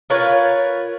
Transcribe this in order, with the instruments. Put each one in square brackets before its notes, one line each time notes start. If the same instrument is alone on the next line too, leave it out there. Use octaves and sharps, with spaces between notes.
[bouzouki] F4 A#4 B4 C#5